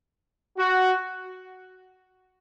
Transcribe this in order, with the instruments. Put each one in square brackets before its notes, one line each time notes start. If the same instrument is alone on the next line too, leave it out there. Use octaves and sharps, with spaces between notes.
[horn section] F#4